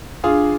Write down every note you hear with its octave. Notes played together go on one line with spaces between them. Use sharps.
D4 F4 G#4